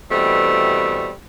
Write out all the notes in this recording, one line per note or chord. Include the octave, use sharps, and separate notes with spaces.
B2 E3 G3 A3 C4